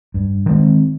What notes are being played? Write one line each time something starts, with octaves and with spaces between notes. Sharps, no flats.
G2
D#3 G#3 C4